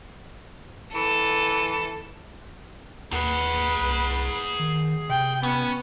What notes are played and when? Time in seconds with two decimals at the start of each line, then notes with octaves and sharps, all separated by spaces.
0.95 E3 A4
3.12 D#2 G#4 B4 F#5
3.81 C2
4.59 D#3
5.09 C3 G5
5.43 B3 C#4